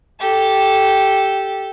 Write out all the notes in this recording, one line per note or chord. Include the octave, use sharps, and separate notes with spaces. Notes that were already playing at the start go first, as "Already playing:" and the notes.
G4 A4